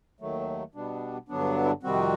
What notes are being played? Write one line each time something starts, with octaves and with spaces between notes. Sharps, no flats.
D#2 D#3 F#3 A3
B2 G3 B3 D4
G2 D3 F#3 B3 D4
E4
F2 C3 D#3 G3 C4 F#4